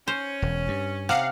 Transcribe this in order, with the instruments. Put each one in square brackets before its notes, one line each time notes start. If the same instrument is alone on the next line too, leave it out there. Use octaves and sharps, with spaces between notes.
[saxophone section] C#4 [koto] C5
[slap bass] E1
G2
[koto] C3 [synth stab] F5 F#5